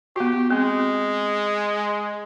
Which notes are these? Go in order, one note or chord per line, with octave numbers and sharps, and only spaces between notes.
B3 F#4 G4
G#3 C4